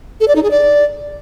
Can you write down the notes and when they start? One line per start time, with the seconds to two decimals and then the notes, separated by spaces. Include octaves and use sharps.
0.20 A4
0.28 D5
0.36 D#4
0.43 G#4
0.51 D5